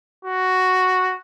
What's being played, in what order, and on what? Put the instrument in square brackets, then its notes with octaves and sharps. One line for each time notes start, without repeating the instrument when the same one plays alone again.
[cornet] F#4